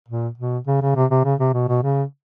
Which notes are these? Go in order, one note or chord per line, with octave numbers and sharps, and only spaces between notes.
A#2
B2
C#3
C#3
C3
C3
C#3
C3
B2
B2
C#3